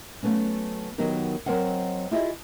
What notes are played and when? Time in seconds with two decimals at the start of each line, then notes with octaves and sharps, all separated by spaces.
0.23 F#3 A3 B3 C#4
0.98 D#3 F#3 B3 D#4 G4 A#4
1.46 F#3 C4 A#4 C5 D#5 F#5
2.11 E4 F4 G4 G#4 D#5 E5